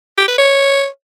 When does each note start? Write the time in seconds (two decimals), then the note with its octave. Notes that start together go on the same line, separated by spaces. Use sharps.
0.18 G4
0.28 B4
0.38 C#5